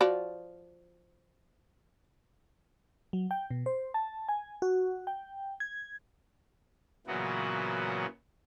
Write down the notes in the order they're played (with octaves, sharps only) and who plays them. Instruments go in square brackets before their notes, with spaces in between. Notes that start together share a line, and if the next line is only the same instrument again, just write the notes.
[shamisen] F3 F#4 D5
[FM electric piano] F#3
G5
B2
C5
A5
G#5
F#4
G5
G#6
[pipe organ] A#2 C#3 E3 F#3 B3 F#4